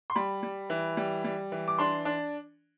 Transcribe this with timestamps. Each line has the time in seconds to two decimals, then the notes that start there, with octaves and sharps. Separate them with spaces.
0.10 C6
0.16 G3 B5
0.43 G3
0.70 E3
0.97 G3
1.25 G3
1.52 E3
1.68 D6
1.79 D4 C6
2.05 D4